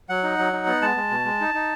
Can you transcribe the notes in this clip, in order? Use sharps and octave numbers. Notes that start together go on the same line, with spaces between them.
F#3 F#5
D#4
F#3
D#4
B3
G#3 A5
G#3
B2
G#3
D#4
D#4